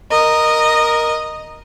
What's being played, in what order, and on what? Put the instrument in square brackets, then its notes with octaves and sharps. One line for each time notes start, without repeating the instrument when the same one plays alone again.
[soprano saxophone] A#4 [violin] D#5